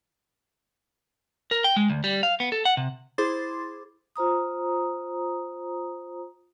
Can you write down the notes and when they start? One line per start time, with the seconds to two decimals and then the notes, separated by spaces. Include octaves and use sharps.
1.51 A#4
1.64 G5
1.76 G#3
1.90 D2
2.04 G3
2.23 F5
2.40 B3
2.52 A4
2.65 F#5
2.77 C3
3.18 E4 G#4 C5 C6 D6 A6
4.16 F4 C5 A#5 D#6